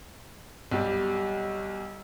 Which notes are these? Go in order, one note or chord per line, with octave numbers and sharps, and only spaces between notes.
B1 G3